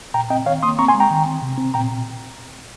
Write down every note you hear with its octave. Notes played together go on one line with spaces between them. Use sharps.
A#2 G5 A#5
C4 D#5 G5
D#3 C#5 F5
A#3 C6 D#6
C4 A#5 C#6
G#5 C6
G#3
G5 A#5
D#3
C4
C3
C4
A#2 G5 A#5